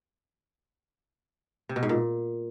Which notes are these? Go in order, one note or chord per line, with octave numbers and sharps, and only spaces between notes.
C3
B2
G#2
A#2